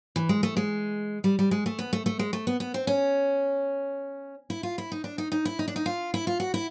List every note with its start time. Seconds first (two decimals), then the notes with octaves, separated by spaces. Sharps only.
0.16 E3
0.29 G#3
0.43 A3
0.57 G#3
1.24 G3
1.39 G3
1.51 G#3
1.66 A3
1.79 B3
1.93 A3
2.06 A3
2.19 G#3
2.33 A3
2.47 B3
2.60 B3
2.74 C4
2.87 C#4
4.50 E4
4.63 F4
4.78 E4
4.92 D#4
5.04 D4
5.18 D#4
5.32 D#4
5.45 E4
5.59 D#4
5.68 D4
5.76 D#4
5.86 F4
6.14 E4
6.27 F4
6.40 F#4
6.54 E4